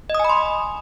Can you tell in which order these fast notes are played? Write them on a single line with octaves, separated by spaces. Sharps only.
D#5 D#6 G#5 B5 C6